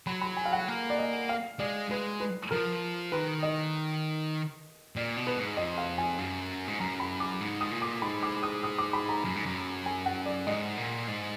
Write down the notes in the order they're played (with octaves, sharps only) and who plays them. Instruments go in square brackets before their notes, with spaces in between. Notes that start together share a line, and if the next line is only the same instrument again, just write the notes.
[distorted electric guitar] F#3 [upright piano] B5
[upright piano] B5
G#5
F5
F#5
[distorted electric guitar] A#3
[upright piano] D5
D#5
F5
[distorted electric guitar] G#3 [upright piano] D5
[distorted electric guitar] G#3 [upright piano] B4
[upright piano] B4
[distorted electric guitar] F3 [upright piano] A#4
[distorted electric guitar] D#3 [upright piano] B4
[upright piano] D#5
[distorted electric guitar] A#2 [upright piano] D5
[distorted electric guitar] B2
[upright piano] B4
[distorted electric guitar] G#2
[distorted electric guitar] F2 [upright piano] D#5
[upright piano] F5
G#5
[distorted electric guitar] F#2
G#2
[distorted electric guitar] F#2 [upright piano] A#5
[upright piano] B5
D6
[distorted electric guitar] G#2
[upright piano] D#6
[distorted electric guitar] A#2
[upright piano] D6
[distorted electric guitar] G#2 [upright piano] B5
[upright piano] D6
D#6
D#6
D6
B5
A#5
[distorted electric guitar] F#2
G#2
F#2
[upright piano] G#5
F#5
D5
[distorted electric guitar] G#2 [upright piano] D#5
[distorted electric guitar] A#2
G#2